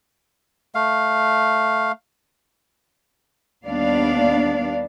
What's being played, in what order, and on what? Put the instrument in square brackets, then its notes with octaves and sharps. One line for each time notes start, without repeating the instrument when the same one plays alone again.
[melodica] A3 F5
[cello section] D#2 G3 B3 D4 D5 F5